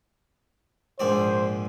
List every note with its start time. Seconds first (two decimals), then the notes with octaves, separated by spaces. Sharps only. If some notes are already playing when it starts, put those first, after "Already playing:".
1.00 A#1 G#2 C5 D5